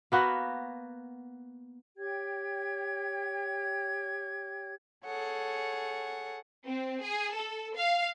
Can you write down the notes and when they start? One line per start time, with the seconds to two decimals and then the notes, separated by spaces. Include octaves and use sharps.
0.12 A#3 B3 F#4 B4
1.98 G4 C#5 G5 G#6
5.05 G#4 A4 C#5 F#5
6.66 C4
7.02 G#4
7.35 A4
7.76 F5